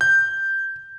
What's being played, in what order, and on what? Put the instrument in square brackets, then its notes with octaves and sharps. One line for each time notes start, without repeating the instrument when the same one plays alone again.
[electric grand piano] G6